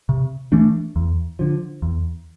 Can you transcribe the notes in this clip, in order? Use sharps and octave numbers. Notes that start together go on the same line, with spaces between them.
C3
E3 A3 D4
E2
D3 F3
E2